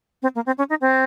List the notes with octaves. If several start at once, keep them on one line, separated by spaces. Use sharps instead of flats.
C4
A#3
C4
C#4
D#4
C4